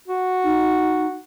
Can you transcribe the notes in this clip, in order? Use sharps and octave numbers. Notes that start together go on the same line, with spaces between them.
F#4
D#4